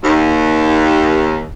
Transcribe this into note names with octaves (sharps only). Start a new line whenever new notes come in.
D#2